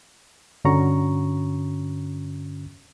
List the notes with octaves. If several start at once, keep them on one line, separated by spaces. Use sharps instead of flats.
G2 D3 C#4 F#4 A#5 C#6